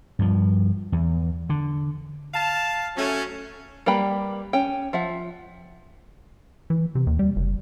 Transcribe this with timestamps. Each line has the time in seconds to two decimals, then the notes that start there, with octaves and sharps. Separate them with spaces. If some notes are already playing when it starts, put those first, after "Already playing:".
0.19 G2 F3
0.92 E2
1.50 D3
2.33 F5 A5
2.97 F#3 A3 C#4
3.86 G3 A#3 B4 G5 B5
4.53 C#4 G5
4.93 F3 E5 F#5
6.70 E3
6.95 C3
7.07 D#2
7.19 G3
7.36 F#1